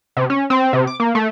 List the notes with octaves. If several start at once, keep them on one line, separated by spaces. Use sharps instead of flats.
C3
C#4
C4
C3
D6
A#3
A3